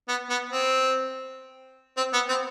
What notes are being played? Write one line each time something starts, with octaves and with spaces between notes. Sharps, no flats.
B3
B3
C4
C4
B3
C4